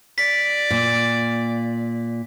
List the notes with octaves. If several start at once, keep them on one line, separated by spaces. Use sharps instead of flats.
D5 B6
A#2